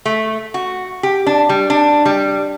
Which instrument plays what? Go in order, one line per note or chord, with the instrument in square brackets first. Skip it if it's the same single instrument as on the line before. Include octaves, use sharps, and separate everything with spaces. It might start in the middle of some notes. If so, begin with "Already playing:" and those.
[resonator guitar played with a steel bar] A3
F#4
G4
D4
G3
D4
G3